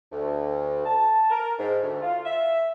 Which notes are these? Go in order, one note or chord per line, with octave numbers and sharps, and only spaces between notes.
D2
A5
A#4
G#2
D2
F4
E5